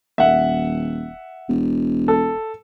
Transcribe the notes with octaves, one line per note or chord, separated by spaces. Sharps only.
D#1 E5 F#5
E1
A4